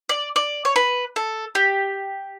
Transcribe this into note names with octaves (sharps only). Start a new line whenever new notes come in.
D5
D5
C#5
B4
A4
G4